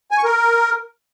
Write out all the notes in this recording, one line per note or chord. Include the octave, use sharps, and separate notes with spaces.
G#5
C#6
A#4